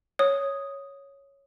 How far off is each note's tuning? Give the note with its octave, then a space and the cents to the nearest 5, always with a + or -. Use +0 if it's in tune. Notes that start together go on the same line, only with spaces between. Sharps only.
C#5 +0 D#6 +0